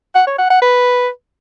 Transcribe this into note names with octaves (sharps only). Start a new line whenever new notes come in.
F#5
C#5
F#5
F#5
B4